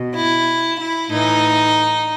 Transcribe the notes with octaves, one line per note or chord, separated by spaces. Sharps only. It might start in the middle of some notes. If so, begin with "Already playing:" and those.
Already playing: B2
E4
E4
A2 E3 D#4